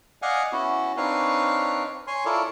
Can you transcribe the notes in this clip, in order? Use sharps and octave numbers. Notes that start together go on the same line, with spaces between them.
D5 D#5 F5 F#5 G#5
B3 C#4 E4 F#4
C4 D4 D#4 B4 C#5 F5
C#5 G#5 C6
E4 F4 A4 A#4 C#5 D5